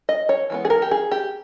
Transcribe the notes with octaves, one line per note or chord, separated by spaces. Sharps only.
D#5
C#5
E3 G#3 B3
G#4
A#4
G4
G#4
G4